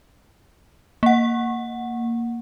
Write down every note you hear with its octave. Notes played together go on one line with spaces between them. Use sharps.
A#3 F#5